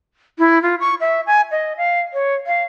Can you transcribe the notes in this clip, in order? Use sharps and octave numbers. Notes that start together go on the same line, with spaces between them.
E4
F4
C#6
E5
G#5
D#5
F5
C#5
F5